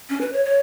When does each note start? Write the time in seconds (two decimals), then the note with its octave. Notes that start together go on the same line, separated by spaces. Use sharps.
0.10 C#4
0.21 B4
0.33 C#5
0.45 C#5